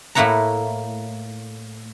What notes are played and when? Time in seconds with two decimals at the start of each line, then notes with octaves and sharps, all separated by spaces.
0.15 A2 A3 A#3 E4 F#5 A#5